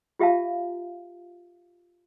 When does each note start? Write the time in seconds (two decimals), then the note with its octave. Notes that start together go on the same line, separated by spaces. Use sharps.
0.19 F4 G4 E5 F5 A5